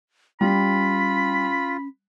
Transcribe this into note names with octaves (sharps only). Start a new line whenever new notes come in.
G3 C#4 F4 B5